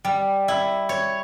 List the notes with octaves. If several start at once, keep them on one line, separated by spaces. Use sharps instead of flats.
G3
E4
C#5